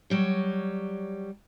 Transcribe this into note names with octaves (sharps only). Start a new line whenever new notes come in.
F#3 G3 C#5